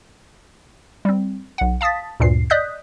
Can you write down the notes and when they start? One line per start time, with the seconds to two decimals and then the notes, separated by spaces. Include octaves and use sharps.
1.05 G3 C4
1.58 B1 F#5
1.81 F5 A5 D#6 A6 B6
2.20 D2 G2 A#2 C7
2.50 D5 D#5 D#6 F#6 G6 B6